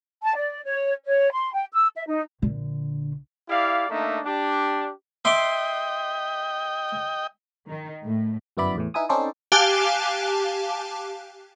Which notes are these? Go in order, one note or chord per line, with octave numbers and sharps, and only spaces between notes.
A5
D5
C#5
C#5
C6
G5
E6
E5
D#4
A#1 D3
E4 G4 D5 F5
A3 A#3 D4 D#4 E5
D4 G4
D#5 E5 G5 C6 D6
D#3
A2
G1 F#2 B3 E4 D5 B5
E2 A2 E3
D#4 E4 B4 G#5 D#6
C4 C#4 D#4 A4 C5 D5
G4 F5 G#5 A5 D6 F#6